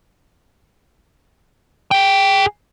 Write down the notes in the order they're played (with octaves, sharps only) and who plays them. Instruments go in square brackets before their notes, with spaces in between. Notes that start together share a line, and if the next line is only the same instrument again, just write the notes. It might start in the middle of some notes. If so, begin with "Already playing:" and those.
[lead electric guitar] G#4 G5